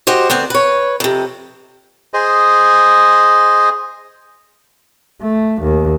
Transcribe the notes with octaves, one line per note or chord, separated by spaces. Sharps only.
F#4 G4 C5 D#5
D2 B3 C4 C5
B4 C#5
F2 C3
G#4 C5 D#5
A3
D#2